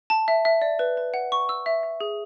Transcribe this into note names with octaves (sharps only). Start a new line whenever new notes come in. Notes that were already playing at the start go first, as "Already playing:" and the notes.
A5
E5
E5
D5
B4
B4
F#5
C#6
E6
E5
E5
G#4